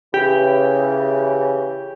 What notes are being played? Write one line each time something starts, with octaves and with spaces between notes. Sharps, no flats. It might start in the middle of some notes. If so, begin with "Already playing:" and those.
C#3 E3 G4